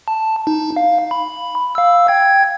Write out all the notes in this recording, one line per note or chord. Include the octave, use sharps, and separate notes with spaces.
A5
D#4
F5
B5
F5 E6
G5 G#6